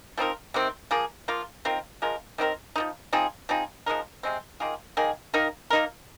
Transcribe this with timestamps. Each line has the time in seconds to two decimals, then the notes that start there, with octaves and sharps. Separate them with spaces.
0.18 F3 C4 D#4 A#4
0.54 C3 D#3 C4
0.91 F3 A#3 G#4
1.28 F3 A#3 F4
1.65 D#3 C4 F4 A#4
2.02 F3 G#3 F4 A#4
2.38 D#3 C4 F4 A#4
2.76 F3 A#3 D#4
3.13 F3 C4 D#4 G#4
3.49 F3 C4 D#4 G#4
3.86 F3 G#3 D#4 A#4
4.23 C3 G#3 C4
4.60 D#3 A#3 F4 G#4
4.97 D#3 A#3 G#4
5.34 D#3 A#3 D#4 A#4
5.70 A#3 D#4 A#4